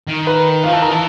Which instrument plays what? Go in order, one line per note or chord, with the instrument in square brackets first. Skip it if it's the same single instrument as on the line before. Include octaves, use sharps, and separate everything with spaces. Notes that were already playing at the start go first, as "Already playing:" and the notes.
[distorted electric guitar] D#3
[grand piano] B4
[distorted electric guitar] F3 [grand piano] F5
[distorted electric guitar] E3 [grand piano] A5
[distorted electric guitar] D#3 [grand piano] A#5
[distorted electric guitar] E3 [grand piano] A5